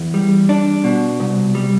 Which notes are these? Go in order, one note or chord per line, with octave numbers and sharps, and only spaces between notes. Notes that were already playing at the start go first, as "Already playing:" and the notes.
Already playing: E2
G3
D4
B2
C2
G3